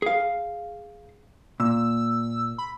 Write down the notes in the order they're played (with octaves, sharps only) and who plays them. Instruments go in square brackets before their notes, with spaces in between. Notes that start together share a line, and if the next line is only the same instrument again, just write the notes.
[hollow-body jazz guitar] G#4 F5
[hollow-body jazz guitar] A#2 [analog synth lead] E6
[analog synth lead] B5